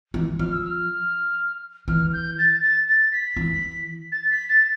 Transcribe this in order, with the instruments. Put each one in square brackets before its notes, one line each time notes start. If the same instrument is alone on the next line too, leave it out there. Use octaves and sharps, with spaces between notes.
[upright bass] E3
[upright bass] F3 [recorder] F6
[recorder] E6
F6
[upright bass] E3 [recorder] F6
[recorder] G6
A6
A6
A6
B6
[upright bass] E3
[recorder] A6
B6
A6